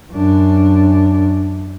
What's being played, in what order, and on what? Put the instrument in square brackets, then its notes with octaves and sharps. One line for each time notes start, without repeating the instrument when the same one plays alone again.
[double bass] F#2 D4